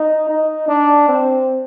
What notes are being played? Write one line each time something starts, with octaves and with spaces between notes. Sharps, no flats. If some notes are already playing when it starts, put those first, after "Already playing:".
Already playing: D#4
D#4
D4
C4